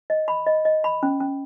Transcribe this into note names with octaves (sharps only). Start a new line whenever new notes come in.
D#5
B5
D#5
D#5
B5
C#4
C#4